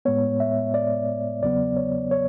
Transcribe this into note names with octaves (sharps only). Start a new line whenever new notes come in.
A2 G#3 B3 C#5
E5
D5
E2 C#3 F#3 B3 D5
C#5
C#5